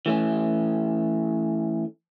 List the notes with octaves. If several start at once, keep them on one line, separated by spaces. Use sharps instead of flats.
E3 A3 C#4